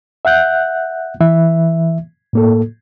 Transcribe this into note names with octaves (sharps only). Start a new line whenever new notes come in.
E5 F#5 F#6 G6
E3 E5
A2 A#3 A4